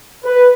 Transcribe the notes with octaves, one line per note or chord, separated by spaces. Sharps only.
B4